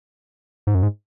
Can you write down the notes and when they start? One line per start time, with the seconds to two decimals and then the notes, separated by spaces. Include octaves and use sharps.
0.67 G#2
0.75 F#2
0.83 G#2